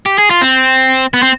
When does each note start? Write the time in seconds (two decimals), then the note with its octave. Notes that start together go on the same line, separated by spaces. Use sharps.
0.06 G4
0.18 G#4
0.30 F4
0.41 C4
1.14 B3
1.23 C4